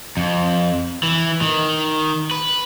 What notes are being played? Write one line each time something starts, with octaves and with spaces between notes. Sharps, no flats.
F2
E3
D#3
B4